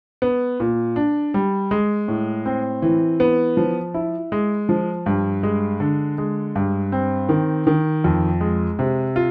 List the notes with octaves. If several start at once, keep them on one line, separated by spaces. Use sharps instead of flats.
B3
A#2
D4
G3
G#3
A2
C4
E3
B3
F3
E4
G#3
F3
G2
G#3
D3
G#3
G2
C4
D#3
D#3
F2
G#3
C3
F4